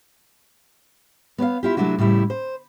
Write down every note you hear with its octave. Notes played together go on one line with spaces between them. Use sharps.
B3 C#5 D5 F5
E4 F4 G4
C3 F#3 A3 D4 E4 F#4
A2 C#3 G3 E4
C5